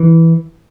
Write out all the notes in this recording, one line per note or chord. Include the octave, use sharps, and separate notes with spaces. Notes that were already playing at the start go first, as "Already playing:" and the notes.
Already playing: E3